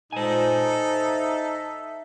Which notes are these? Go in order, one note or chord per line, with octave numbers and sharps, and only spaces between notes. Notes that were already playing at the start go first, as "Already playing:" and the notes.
A#2 D#4 A4 C5 G#5
E5